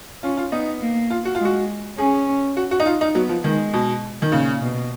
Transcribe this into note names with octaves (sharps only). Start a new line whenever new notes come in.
C#4 F4
F4
B3 D#4
A#3
F4
F#4
F4
G#3
F#4
C#4 G#4
F#4
F#4
D#4
F4
D#4
F#3 B3
F3
D#3 G#3
B2
D#3
A#2 C#3
B2